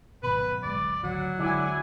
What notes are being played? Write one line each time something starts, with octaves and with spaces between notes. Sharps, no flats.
G#1 F#2 B2 B4 B5
D1 G#3 D5
G#1 D2 F#3
D3 G#3 E4 G#4 D5 G#5